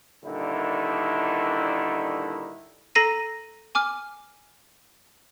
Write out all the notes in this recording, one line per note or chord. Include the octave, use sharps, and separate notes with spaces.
G2 A#2 D3 D#3 D#4 E4
A4 A#5 A#6 C7 D#7
G#5 D6 F6